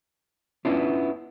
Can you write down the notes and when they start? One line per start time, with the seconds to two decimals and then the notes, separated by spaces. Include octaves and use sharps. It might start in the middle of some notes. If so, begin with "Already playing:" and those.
0.65 B3 C#4 D4 E4 F4